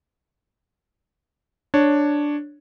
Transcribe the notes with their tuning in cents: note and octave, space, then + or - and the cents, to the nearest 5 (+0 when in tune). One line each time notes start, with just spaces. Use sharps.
D4 +0 C#5 +0